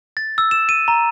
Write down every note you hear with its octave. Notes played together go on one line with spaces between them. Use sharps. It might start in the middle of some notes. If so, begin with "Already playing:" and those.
A6
E6
E7
D#7
A#5